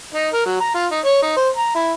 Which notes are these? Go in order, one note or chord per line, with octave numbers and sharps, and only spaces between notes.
D#4
A#4
F#3
A#5
F4
D#4
C#5
D#4
C5
A#5
E4